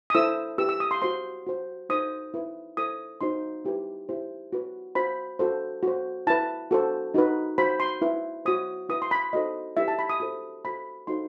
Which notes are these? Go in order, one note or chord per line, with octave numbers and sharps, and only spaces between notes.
D#6
E4 A4 C5 E6
E4 G4 B4 E6
E6
D#6
C6
F#4 C5 C6
F#4 C5
D#4 A4 C5 D#6
E4 B4
E4 A4 C5 D#6
D#4 F#4 C5 C6
E4 G4 B4
E4 G4 C5
F#4 B4
F#4 C5 B5
F#4 A4 C5
F#4 C5
E4 B4 A5
F#4 A4 C5
D#4 F#4 B4
F#4 C5 B5
C6
E4 B4
F#4 C5 D#6
E4 B4 D#6
C6
B5
D#4 F#4 A4 C5 D#5
E4 G4 B4 E5
A5
B5
D#6
F#4 A4 C5 D#6
F#4 A4 C5 B5
D#4 F#4 A4 C5 C6